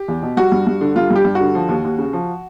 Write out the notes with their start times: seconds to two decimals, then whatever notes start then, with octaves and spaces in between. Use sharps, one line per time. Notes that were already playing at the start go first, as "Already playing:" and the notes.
Already playing: G4
0.08 E2
0.22 B2
0.37 G3 F#4
0.52 G2
0.67 G2
0.81 D3
0.96 G3 F4
1.10 G2
1.16 G4
1.25 G2
1.35 F#4
1.40 D3
1.55 F3
1.69 D#2
1.85 D#2
1.98 C#3
2.13 F3